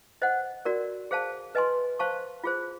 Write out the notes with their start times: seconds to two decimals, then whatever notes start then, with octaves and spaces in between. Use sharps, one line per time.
0.22 C5 D#5 F#5
0.65 F#4 A#4 D5
1.11 G#4 C5 F5 A5
1.55 B4 D#5 G#5 C6
1.99 C5 F5 A5 C#6
2.44 F4 G#4 C5